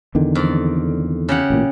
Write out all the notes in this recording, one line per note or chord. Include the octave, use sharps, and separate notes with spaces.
E2 D3 D#3
F2 D5
C#3 G4 F#5
A1 A#2